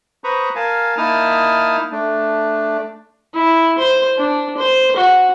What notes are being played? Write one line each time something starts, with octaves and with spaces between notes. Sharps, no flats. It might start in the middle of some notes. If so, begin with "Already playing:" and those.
B4 C5 A#5 B5 C#6 D#6
A#4 F5 G#5 A5
A#3 D#4 E4 A5 D#6 F6
A3 D4
E4
C5
D4
C5
F#4